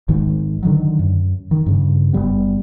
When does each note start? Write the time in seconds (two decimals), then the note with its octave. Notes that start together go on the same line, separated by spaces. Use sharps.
0.08 G#1 G#2 D#3 G#3
0.63 D3 D#3 F#3
0.99 F#2
1.51 D#3
1.66 G2 C#3
2.13 F#1 F2 G3 B3